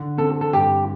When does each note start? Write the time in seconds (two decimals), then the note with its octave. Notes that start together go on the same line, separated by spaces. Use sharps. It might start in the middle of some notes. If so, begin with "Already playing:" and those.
Already playing: D3
0.18 C4 A4
0.41 A4
0.53 G2 G4